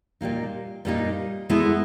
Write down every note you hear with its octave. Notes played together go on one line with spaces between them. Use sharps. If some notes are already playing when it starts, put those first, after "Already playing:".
A#2 G3 A#3 D#4
A#2 G3 A#3 D#4
G#3 B3 E4 A4